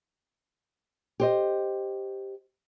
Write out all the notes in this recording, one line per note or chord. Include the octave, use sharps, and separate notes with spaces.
G4 C5 D#5